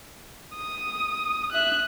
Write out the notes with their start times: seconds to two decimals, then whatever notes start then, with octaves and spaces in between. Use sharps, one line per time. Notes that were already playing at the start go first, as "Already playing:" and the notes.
0.55 D#6
1.52 E5 F#6